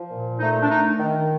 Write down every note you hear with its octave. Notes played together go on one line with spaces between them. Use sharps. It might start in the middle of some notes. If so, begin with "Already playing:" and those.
Already playing: F3
A#2
A3 D#4
D4
A3 D#4
D#3